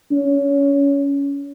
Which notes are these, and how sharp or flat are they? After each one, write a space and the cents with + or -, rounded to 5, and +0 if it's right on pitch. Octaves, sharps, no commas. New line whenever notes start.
C#4 +20